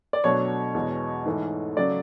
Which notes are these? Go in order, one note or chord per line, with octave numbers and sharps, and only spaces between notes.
D5
B2 F#3 A3 D4 C#5
E2 B2 G#3
G#2 E3 A3
C#3 F#3 A3 D5